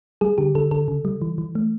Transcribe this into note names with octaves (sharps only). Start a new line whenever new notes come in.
G3 G#4
D3 G4
D3 A4
D3 A4
C#3
G3
E3
E3
A3